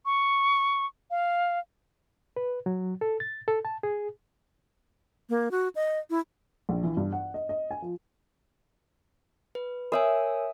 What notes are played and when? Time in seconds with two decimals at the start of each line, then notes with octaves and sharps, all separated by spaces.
0.06 C#6
1.11 F5
2.36 B4
2.66 F#3
3.01 A4
3.20 A6
3.48 A4
3.65 A5
3.83 G#4
5.29 A#3
5.51 F#4
5.75 D#5
6.10 E4
6.69 A#1
6.84 E3
6.97 G2
7.12 F#5
7.34 D#5
7.49 D#5
7.71 G#5
7.82 F3
9.55 B4
9.92 A#4 C#5 E5 G#5 D#6